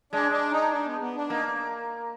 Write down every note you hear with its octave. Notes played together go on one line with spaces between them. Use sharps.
G#3 D4
D4
D#4
D4
B3
B3
D4
A#3 D#4